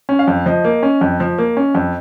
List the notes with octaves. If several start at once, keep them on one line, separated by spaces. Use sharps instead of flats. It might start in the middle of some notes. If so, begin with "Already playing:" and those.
C#4
F5
F2
F3 D#5
A#3
C#4
F2
F3
A#3
C#4
F2